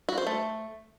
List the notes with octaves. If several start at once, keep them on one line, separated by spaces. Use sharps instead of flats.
F#4
C5
A3